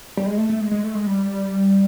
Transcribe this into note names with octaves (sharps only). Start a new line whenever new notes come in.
G3
G#3
A3
A3
G#3
G#3
A3
G#3
G3